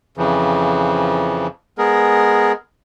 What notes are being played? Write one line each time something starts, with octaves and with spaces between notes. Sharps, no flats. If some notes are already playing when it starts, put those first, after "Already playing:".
F2 C#3 E3 F3
G#3 B3 G#4 A#4